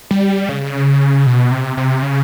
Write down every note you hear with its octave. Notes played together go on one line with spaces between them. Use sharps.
G3
C#3
B2
C3
C3
C#3